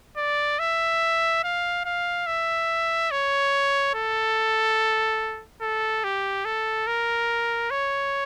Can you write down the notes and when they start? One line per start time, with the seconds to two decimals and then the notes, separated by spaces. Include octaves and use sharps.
0.17 D5
0.59 E5
1.44 F5
1.85 F5
2.26 E5
3.11 C#5
3.95 A4
5.61 A4
6.04 G4
6.45 A4
6.87 A#4
7.70 C#5